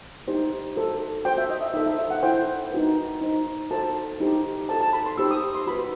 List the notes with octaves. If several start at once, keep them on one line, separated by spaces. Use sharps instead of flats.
D#4 G4 C5
F#4 A4 C5
F#4 C5 G5
E5
D#5
E5
D#4 A4 C5 E5
E5
E5
F#5
E4 A4 C5 G5
D#4 F#4 B4
D#4 F#4 C5
F#4 A4 C5 A5
D#4 G4 C5
F#4 A4 C5 A5
A5
B5
C6
D#4 G4 C5 E6
D#6
C6
F#4 B4 B5